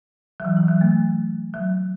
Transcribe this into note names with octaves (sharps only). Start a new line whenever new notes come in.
F#3
E3
E3
F#3
A3
F#3